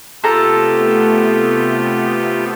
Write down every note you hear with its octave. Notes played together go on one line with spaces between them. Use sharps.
C3 A3 B3 F4 G4 A4 A#5